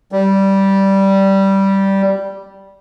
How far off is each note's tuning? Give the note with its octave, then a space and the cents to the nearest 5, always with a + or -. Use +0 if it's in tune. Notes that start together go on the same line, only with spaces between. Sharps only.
G3 -10